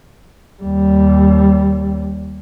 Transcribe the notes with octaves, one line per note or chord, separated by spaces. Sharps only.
D#2 G3